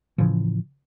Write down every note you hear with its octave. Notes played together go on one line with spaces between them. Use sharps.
A2 C#3 E3 F3